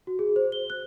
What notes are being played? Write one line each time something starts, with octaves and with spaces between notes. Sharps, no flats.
F#4
G#4
C5
G7
F#6